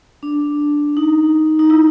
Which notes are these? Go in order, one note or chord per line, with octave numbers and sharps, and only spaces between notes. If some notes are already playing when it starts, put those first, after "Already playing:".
D4
D#4
D#4
E4